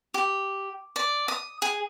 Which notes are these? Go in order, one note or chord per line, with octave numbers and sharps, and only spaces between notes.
G4
D5
D#6
G#4